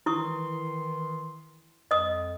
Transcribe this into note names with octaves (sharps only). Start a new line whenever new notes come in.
D#3 E3 E4 C6 C#6 D#6
F2 D#5 D#6